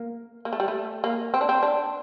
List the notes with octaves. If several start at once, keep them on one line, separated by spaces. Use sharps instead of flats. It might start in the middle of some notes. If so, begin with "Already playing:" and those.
Already playing: A#3
A#3
A3
G3
A3
A#3
C4
D4
C4
D4